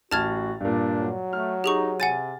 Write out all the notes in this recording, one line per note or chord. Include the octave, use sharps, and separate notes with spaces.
A1 F#4 A5 F6 G#6 A6 F7
G2 A#2 D4
F#3
A3 F6
D#4 G4 G#4 C#6
C3 F#5 G#5 A6 D#7